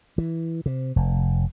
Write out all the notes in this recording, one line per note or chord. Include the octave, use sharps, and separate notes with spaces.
E3
C3
F1